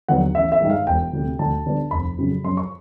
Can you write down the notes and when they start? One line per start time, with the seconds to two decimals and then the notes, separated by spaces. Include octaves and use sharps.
0.08 D#2 D3 F#3 B3 F#5
0.35 A1 E5
0.52 E5
0.61 G2 D#3 G#3
0.70 F5
0.87 E1 G5
1.13 D2 C3
1.39 D2 A5
1.66 D3 G3 B3 D4
1.91 F1 B5
2.17 F2 C#3 F#3
2.44 F#2 C6
2.57 C#6